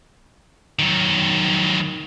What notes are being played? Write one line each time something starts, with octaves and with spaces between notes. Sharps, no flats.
D#3 F#3